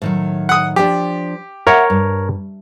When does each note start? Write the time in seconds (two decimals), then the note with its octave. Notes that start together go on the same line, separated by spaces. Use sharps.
0.02 A2 D#3 F#3
0.49 F#5 D#6
0.76 F3 D4 G4
1.67 A#4 C#5 E5 F#5 G#5
1.90 G2